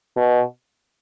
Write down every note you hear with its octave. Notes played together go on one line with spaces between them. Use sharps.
B2